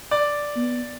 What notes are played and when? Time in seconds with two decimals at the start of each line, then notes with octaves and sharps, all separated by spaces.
0.11 D5
0.56 B3